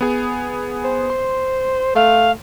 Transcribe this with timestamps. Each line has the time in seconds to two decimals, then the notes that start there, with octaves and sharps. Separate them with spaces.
0.01 B3 G#4 G#5
0.84 C5
1.10 C6
1.95 A3 F5